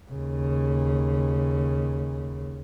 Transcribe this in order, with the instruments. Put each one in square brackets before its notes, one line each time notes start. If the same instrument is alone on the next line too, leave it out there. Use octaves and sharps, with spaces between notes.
[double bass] D#2 C#3